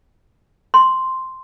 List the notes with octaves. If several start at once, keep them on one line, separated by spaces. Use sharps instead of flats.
C6